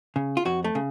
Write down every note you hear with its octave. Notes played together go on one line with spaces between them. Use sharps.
C#3
F4
F2 F#4
A3
C#3